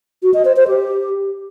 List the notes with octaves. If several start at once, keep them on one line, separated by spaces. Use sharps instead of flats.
F#4
D#5
C5
C5
G4